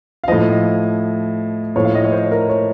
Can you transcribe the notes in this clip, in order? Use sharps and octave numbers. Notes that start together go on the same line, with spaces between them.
F5
A2 F3 D#5
A2 F3 C#5
F5
D#5
C#5
C5
A#4
C#5